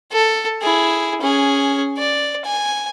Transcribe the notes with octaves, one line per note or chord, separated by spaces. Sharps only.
A4
E4 G#4
C#4 G#4
D5
G#5